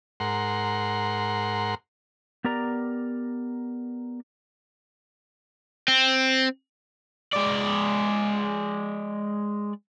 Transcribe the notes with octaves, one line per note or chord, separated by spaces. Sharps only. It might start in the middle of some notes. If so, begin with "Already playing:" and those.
G#2 A#4 F#5 C6
B3 G4 A#4 D5 A#5
C4
G#3 D5